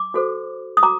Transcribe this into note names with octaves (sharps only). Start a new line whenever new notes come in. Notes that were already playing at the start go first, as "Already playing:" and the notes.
Already playing: D6
F#4 A4 C5
D#6
F#4 A#5 D6